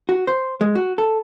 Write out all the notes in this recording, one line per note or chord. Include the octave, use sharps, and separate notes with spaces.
F#4
C5
G#3
F#4
A4